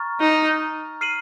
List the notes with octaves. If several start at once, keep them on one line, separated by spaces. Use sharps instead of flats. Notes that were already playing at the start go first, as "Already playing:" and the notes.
Already playing: A#5 C#6 F6 A6
D#4
F6 C7 D#7 F#7